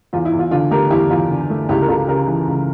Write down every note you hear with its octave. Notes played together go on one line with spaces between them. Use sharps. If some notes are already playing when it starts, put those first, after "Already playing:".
E2 F4
E4
E2
F4
D3 F4
A3 G4 A#4
E2 E4 G4
E2 F4
D3
A3
C#2 E4 G4
A#4
C#2 F4 A4
C#3 G4 A#4
E3
C#2